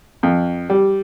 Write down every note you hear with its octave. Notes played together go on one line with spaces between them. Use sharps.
F2
G3